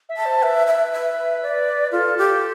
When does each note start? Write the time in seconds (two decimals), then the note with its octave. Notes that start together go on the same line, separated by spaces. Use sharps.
0.09 E5
0.17 A5
0.25 C5
0.42 B4 E5
0.67 E5
0.93 E5
1.42 D5
1.92 F4 A4
2.18 G4